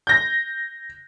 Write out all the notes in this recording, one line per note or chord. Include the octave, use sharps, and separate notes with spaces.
G6 A#6